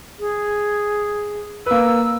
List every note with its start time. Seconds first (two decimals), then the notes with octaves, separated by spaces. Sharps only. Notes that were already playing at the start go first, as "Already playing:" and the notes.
0.19 G#4
1.66 A#3 B4 E6